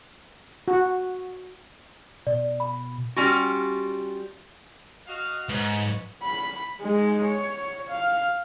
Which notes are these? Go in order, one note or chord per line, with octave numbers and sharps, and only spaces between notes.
F#4
B2 D5
B5
G3 C#4 F4 F#4
F#4 D#5 F5
G#2 B4 C#5
B5
G#3 D#4
C#5
F5